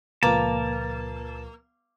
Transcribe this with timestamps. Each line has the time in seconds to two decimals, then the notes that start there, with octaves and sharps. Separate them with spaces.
0.23 C#2 A#2 F3 A#3 B4 A5 A#5 D6